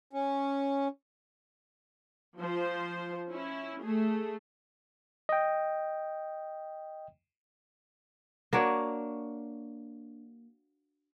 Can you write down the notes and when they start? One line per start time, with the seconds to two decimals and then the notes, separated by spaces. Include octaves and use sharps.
0.13 C#4
2.38 F3 C5
3.31 C#4 E4
3.82 A3 G#4
5.29 D#5 G5
8.53 A#3 D4 F#4 C#5